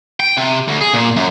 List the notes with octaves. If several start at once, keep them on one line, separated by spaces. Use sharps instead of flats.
G5
C3
D2
G#4
A#2
F#2